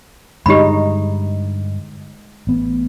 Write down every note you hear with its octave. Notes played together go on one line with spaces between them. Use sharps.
G2 D3 G#3 D#4 G4 B5
A1 B3